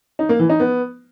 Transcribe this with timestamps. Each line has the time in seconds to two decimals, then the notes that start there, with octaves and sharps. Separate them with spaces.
0.19 D#4
0.29 A#3
0.39 E3
0.49 D#4
0.60 B3